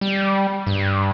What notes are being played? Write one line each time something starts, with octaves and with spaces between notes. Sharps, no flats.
G3
G2